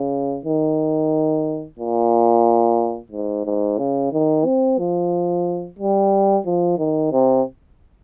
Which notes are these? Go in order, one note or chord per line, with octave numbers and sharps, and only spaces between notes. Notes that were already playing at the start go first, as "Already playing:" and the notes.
Already playing: C#3
D#3
A#2
G#2
G#2
C#3
D#3
C4
F3
G3
F3
D#3
C3